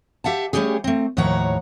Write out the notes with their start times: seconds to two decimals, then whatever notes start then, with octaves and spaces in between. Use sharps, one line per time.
0.24 G4 E5 F#5 A5
0.53 G3 A3 C4 C#4 G4 G#4
0.84 A3 C4
1.17 D#2 A2 F3 C#5 F#5 A#5